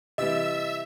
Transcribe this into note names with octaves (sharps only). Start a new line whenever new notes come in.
C3 E3 G3 D#5 E5 E6